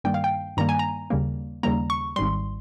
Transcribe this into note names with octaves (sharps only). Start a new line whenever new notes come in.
G2 D#3 G3 A#3 G5
F5
G5
G2 D#3 G3 A#3 A#5
G#5
A#5
D#2 C#3 G3 A#3
D#2 C#3 G3 A#3 A#5
C#6
G#1 G#2 G3 C6